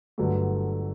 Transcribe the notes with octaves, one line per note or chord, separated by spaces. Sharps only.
G1 G2 D3 F#3 A3